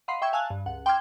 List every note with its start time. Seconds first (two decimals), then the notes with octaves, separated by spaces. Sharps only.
0.08 D#5 F5 F#5 B5 C6 C7
0.22 E5 G5 C#6 E6 G#6
0.33 F5 G#5 A5 E6 F#6
0.50 G2
0.66 C#2 F#5
0.86 G5 C6 D6 E6 F6 G#6